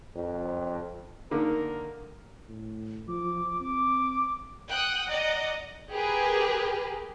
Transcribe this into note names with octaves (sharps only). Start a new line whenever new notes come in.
F2
D3 D#3 A#3 A#4
A2
F3 D6
C4 D6
F#5 G5 D#6 F#6
D5 D#5 F#5 A#5
G4 G#4 A#4 B4